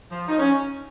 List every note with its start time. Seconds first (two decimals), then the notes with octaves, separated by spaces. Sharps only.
0.10 F3
0.27 F3 D#4
0.39 C#4